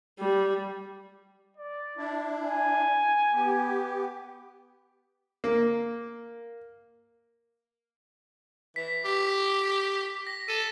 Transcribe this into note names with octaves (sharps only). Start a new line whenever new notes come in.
G3
D5
D4 E4
G#5
B3 G4
A#3
E3 B6
G4
A#6
A4 D#7